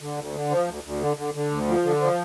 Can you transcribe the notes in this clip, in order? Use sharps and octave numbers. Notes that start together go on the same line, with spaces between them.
D3
D2
D3
F3
D2
D2
D3
D3
D3
D2
F3
D3
F3